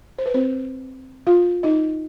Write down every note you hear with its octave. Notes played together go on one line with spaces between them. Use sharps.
C5
B4
C4 C5
F4 F5
D#4 D#5